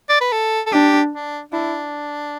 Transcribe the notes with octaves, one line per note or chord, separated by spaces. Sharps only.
D5
B4
A4
A4
D4 G4
D4
D4 E4